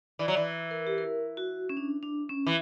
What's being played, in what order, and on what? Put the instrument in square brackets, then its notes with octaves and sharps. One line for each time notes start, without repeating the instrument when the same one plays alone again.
[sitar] E3 [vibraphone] D5
[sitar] F#3
E3
[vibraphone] A#4
G4
A#4
F#4
C#4
D4
D4
C#4
[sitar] E3